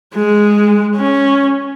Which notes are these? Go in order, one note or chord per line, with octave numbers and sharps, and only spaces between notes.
G#3
C#4